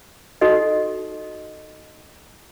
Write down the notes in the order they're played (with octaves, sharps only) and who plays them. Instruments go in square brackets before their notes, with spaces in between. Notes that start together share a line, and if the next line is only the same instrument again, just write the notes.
[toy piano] D#4 F#4 A4 D#5